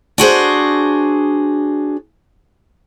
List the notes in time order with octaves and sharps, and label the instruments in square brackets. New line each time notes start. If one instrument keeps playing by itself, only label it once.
[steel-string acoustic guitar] D4 F#4 G#4 C5